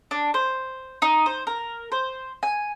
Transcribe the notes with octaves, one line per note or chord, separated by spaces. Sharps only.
D4
C5
D#4
C5
A#4
C5
G#5